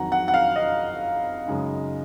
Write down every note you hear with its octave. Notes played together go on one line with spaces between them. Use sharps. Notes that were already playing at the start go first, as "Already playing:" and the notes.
Already playing: F2 D#3 F#3 F#5 A#5
F#5
F#5
F5
D#5
F#2 C#3 G#3 D#4